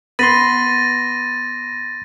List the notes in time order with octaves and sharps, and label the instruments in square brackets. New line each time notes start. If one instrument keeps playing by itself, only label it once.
[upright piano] B3 [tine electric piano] B5 C6 [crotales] A6 A#6 D#7